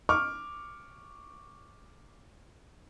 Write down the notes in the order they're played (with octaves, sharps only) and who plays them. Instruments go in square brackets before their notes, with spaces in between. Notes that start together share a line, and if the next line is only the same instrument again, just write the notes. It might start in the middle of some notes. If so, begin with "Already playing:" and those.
[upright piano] C#6 D6 F6